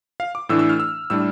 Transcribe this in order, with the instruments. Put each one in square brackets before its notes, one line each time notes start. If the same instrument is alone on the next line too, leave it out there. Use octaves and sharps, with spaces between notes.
[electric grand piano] F5
D6
A2 E3 A3 D4 E6
E6
F6
E6
A2 G3 D4 E6